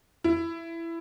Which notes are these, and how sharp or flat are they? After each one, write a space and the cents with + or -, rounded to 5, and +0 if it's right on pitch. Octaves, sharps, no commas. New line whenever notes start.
E4 +15